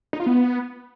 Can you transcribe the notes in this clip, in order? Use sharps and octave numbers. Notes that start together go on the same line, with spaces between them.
D#4
F4
B3